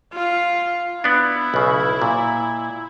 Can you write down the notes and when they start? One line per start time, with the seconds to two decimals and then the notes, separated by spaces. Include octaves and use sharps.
0.14 F4
1.04 B3 D4 E4
1.54 B1 C#3
2.02 A#2